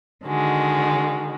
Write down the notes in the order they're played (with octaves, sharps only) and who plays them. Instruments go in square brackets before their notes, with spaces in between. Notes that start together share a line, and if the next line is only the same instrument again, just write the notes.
[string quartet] D3 D#3 G#3 F#4